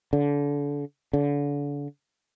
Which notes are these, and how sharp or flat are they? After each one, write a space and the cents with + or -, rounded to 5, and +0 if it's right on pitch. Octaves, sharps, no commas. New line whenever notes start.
D3 -30
D3 -35